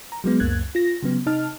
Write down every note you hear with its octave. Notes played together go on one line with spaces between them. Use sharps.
A#5
F#3 G#3 B3
C#2 F#2 A#3 F#6 G#6
F4 A#6
C#3 F#3 B3
C3 D#4 D#5 A5 F6